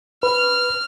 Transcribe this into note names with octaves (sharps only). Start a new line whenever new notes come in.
B4 F6